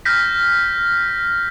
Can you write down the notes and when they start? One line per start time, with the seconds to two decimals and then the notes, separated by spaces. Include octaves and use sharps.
0.05 F6 G6 A#6 B6